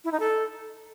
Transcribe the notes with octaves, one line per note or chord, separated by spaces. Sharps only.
E4
D#4
A4